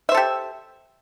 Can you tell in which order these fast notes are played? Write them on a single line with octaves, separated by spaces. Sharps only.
E5 C5 A4 G4